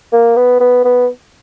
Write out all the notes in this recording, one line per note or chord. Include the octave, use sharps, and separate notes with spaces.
A#3
B3
B3
B3